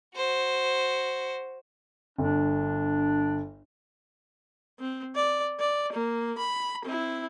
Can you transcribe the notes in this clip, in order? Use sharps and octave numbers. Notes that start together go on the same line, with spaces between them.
F#4 C5
G1 D4
C4
D5
D5
A#3
B5
C4 E4